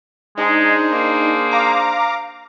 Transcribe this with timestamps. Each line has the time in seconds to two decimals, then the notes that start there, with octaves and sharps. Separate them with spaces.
0.37 G#3 D4 D#4 G#4 C5
0.91 A#3
1.51 F5 A#5 D6